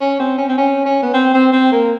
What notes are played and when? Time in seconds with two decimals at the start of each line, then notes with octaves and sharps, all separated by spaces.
0.01 C#4
0.20 C4
0.38 C#4
0.49 C4
0.58 C#4
0.86 C#4
1.03 B3
1.14 C4
1.34 C4
1.53 C4
1.72 A#3